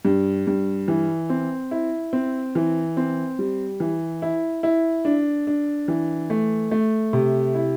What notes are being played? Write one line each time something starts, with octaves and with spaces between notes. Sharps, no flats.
G2
G2
E3
C4
E4
C4
E3
C4
G3
E3
E4
E4
D4
D4
E3
A3
A3
C3
E4